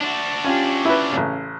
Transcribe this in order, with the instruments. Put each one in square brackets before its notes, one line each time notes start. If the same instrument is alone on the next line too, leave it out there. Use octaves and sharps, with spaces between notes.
[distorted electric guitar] D4 F#4
[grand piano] C#4 F4 G4
[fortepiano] E4 B4
A1 C#3